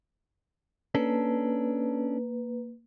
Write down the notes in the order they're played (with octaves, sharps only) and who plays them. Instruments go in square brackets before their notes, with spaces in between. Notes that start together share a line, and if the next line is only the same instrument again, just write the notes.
[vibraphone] A#3 B4 [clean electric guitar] C#4 D4 A4